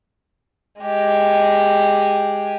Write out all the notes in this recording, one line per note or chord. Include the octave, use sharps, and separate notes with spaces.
G#3 G4